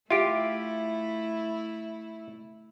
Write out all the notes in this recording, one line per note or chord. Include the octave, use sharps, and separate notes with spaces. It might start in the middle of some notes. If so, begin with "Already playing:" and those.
A3 E4 F4 G4 E5 D7